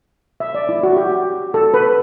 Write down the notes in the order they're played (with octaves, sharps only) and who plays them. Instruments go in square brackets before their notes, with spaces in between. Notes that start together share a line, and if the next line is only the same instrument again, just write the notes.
[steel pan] E5
D5
E4
F#4
G4
A4
B4